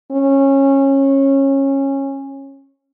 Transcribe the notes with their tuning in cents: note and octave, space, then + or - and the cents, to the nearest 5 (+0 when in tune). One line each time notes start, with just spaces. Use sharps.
C#4 -20